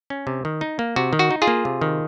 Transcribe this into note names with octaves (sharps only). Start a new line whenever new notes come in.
C#4
C3
D#3
D#4
A#3
C3 F#4
D#3
F#4
D#4
F4 G#4
A#3
C3
D#3